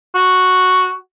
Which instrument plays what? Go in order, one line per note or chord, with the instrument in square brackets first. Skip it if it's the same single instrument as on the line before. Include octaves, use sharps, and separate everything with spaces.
[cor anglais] F#4